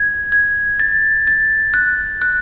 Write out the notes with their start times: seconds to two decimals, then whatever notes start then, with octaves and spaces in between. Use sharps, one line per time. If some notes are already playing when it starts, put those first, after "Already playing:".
Already playing: G#6
0.32 G#6
0.79 A6
1.27 A6
1.74 F#6
2.22 F#6